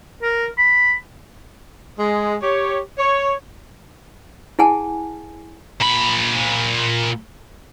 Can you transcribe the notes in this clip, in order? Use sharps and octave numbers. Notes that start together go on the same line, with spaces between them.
A#4
B5
G#3
G4 C#5
C#5
E4 G#4 F#5 G#5 A5
A#2 B5